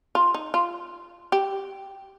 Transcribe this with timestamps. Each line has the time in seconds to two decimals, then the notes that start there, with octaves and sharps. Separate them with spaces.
0.15 F4
0.34 D#4
0.54 F4
1.32 G4